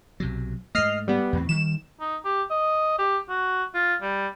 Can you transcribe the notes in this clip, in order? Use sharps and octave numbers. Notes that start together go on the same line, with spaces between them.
B1 C3 F#3
G#2 A3 D#5 F6 C7
G3 B3
E2 A2 C4
D#3 G3 E7
D#4
G4
D#5
G4
F#4
F4
G3